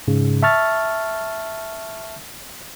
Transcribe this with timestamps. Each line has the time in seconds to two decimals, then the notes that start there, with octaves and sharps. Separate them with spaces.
0.08 G#2 C#3
0.43 E5 A5 C#6 F6 A6